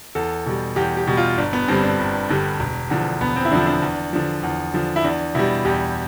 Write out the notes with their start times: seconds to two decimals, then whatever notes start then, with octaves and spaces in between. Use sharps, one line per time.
0.15 E2 A4
0.46 B2 G3
0.76 E2 G4
0.97 G4
1.07 B2 G3
1.17 F4
1.38 G1 D4
1.53 B3
1.68 G2 D3 G3 C4
1.83 D4
1.99 G1
2.29 G2 D3 G3
2.60 E1
2.90 E2 D3 F3
3.21 E1 B3
3.36 C4
3.45 E4
3.51 E2 D3 F3 D4
3.67 D4
3.82 E2
4.13 D3 F3
4.43 E2
4.74 D3 F3
4.96 E4
5.04 E2 D4
5.35 B2 G3 E4
5.65 E2 G4